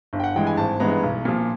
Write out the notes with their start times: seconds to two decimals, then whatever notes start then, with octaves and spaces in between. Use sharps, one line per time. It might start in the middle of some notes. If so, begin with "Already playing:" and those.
0.13 G1
0.20 G5
0.24 F#5
0.35 G2 E3 G#3 G5
0.47 G#5
0.57 G#1 A5
0.80 G2 E3 G#3 B3 A#5
1.03 B1
1.25 A#2 F3